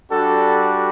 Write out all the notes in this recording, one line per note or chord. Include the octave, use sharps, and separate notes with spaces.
G3 D4 F#4 A4